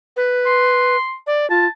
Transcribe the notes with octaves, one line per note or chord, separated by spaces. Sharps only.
B4
C6
D5
F4 A5